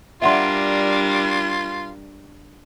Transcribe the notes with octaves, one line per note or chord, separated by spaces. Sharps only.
G3 D4 F4 A#4 E5 F#5 C6